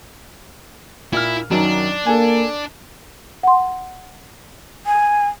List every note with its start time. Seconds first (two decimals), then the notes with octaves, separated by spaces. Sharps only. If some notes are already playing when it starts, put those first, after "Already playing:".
1.13 A#2 E4 F6
1.51 F#2 D#3 F#3 D4
2.06 A#3 A4 G#5
3.43 F#5 C6
4.86 G#5